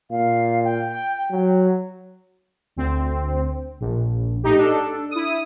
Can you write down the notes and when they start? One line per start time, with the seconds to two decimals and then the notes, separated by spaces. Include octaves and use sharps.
0.11 A#2 F5
0.64 G5
1.31 F#3
2.76 D2 C4
3.80 A#1
4.43 A2 D#4 G4
4.58 D4 A4
5.11 E4 D#6